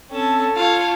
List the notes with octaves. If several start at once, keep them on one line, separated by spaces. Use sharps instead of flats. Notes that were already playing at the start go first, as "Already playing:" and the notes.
C4 C#4 A4 A5
F4 C#5 F5 A5